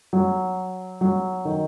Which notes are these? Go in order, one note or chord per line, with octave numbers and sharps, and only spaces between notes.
F#3
F#3
D#3